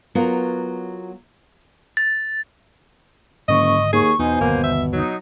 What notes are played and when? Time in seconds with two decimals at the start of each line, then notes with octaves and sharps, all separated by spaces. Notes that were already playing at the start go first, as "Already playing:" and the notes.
0.15 F#3 B3 F4 A#4
1.97 A6
3.48 F#1 G#2 D3 D#3 D#5 C#6
3.93 D#2 G#4 C#6
4.19 E2 B2 D#4 C5 G#5
4.41 G1 D#2 C3 A#3
4.64 E5
4.93 F#3 D#4